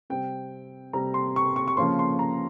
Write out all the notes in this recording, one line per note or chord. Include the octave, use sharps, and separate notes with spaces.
C3 G3 C4 G5
C3 G3 C4 A#5
C6
C#6
C#6
C#6
C#3 F3 A#3 C#4 C6
C6
A#5